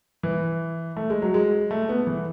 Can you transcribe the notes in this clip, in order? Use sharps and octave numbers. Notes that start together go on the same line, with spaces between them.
E3
A3
G#3
F#3
G#3
A3
B3
E3